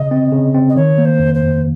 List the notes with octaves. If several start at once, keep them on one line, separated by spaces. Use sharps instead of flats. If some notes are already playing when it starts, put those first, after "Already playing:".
Already playing: C#3 D#5
C4
C#3
C4
D#5
D#3 C#5
A#3
C5
F2
C5
F2